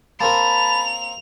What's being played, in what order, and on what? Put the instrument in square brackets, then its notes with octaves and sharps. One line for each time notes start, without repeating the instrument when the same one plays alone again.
[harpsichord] A#3 C4 A#4 [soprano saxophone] A5 [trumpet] B5 [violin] F7